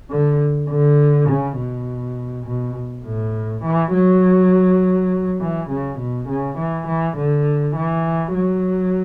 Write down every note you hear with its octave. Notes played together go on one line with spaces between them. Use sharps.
D3
D3
C#3
B2
B2
A2
E3
F#3
E3
C#3
B2
C#3
E3
E3
D3
E3
F#3